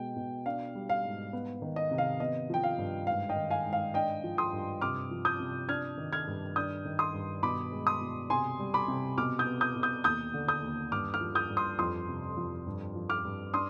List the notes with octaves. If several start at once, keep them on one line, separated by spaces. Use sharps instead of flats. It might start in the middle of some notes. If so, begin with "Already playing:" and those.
Already playing: B2 G#3 G5
B2
D4 F5
G3
F5
G#2
B3
D#3
D#5
C3
F5
B3 D#5
F3 G5
F5
G2
G#2 F5
D#5 G5
D#3
F5 G#5
G#2
F5
D4 D#5 G5
F3
C6 D#6
G2
C3 D6 F6
F3
D#6 G6
C3
D4 F6 G#6
D#3
F6 G#6
G2
D4 D#6 G6
D#3
C6 D#6
G2
B2 B5 D6
G#3
C6 D#6
B2
C3 G#5 C6
G3
B5 D6
C3
B2 D6 F6
D#6 G6
B3
D#6 G6
B2
D#6 G6
D#2 D#6 G6
D3
D#6 G6
D#2
G2 D6 F6
D6 F6
F3
D#6 G6
G2
C6 D#6
F2 C6 D#6
C3
F2
G2
F3
D6 F6
G2
D4 C6 D#6